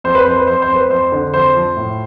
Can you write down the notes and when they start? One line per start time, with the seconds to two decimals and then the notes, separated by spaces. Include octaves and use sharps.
0.04 F2 C5
0.15 B4
0.26 F2 C5
0.36 B4
0.47 F2 C5
0.62 C5
0.69 F2
0.76 B4
0.90 F2 C5
1.12 D3
1.33 F2 C5
1.55 F3
1.77 A2